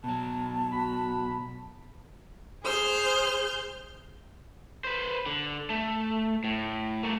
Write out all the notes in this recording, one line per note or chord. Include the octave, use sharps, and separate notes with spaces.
B2 F#3 A5
F#4 B5
G#4 C5 F6 G6
B4 C5
D3
A3
A2
A3 A#3